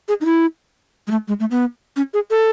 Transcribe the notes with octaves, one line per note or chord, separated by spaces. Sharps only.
G#4
D#4
E4
G#3
A3
G#3
A3
B3
C#4
G#4
A4